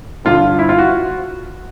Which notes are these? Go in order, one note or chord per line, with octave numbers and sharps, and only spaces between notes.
G2 D3 F4
E4
F4
F#4